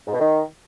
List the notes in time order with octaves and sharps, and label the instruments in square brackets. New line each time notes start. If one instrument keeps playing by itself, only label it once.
[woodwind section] G#2
B2
D#3